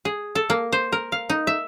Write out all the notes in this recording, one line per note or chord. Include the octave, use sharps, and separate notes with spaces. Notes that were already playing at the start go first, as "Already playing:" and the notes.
G#4
A4
A#3
C5
A#4
F5
D#4
E5